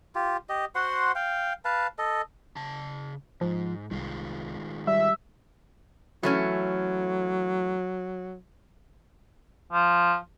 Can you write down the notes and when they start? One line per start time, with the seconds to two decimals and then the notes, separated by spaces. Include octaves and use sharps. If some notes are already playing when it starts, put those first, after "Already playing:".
0.15 F4 G4
0.49 G4 D#5
0.75 F#4 C5 F#5 C6
1.15 F5 G5
1.65 B4 F5 A5
1.98 A4 D#5
2.56 C#3 A5
3.41 G#2 F3
3.91 C2 D#3 G#3 F4
4.87 G3 E5
6.23 E3 F#3 A3 C#4
9.72 F3